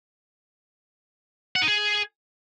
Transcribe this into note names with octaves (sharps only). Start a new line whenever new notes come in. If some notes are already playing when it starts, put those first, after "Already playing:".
F#5
D#4
G#4